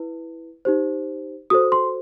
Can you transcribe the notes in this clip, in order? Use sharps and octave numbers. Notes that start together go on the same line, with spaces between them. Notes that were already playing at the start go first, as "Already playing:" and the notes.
Already playing: E4 B4
D#4 G4 C5
F#4 A4 C5 D#6
C6